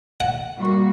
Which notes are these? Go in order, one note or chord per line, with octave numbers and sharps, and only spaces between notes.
F#5
G3 A#3 F#4